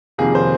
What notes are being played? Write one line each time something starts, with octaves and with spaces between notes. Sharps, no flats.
F2 C3 D#3 A#3 G#4
C5